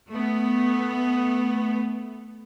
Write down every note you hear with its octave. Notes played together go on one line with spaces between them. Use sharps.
A3 B3